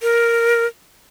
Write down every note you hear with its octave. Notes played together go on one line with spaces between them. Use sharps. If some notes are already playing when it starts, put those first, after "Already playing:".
A#4